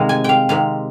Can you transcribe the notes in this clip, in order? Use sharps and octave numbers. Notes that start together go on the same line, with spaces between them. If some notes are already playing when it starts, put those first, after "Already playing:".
Already playing: C3 D#3 G#3 F5
G#5
F5 G5
C3 D#3 G#3 F5